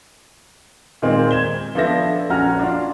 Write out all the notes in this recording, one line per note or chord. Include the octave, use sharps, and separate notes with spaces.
A#2 D#3 G#3 C4
G#6 E7 G7
F3 B3 D4 A4 E5 A#6
A#1 C#4 F#4 A#5 F6
D4 F4